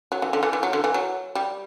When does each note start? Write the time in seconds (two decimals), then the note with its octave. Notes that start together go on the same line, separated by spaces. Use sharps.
0.12 F#3
0.22 E3
0.33 D3
0.43 E3
0.53 E3
0.63 F#3
0.73 D3
0.84 E3
0.94 F#3
1.35 G3